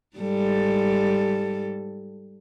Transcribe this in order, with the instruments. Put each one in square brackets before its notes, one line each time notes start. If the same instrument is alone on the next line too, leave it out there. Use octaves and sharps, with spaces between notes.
[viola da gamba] G#2 G3 A4